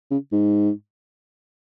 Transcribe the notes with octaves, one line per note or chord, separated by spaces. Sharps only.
C#3
G#2